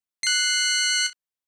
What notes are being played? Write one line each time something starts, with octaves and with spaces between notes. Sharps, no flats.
F#6 C7